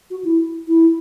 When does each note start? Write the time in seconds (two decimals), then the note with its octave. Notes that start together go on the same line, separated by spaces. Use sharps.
0.11 F#4
0.25 E4
0.68 E4